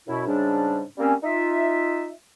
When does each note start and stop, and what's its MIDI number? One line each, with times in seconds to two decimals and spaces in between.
0.08 0.22 42
0.08 0.22 47
0.08 0.22 64
0.27 0.82 44
0.27 0.82 49
0.27 0.82 55
0.27 0.82 62
0.98 1.14 55
0.98 1.14 58
0.98 1.14 60
0.98 1.14 61
1.23 2.09 63
1.23 2.09 65
1.23 2.09 76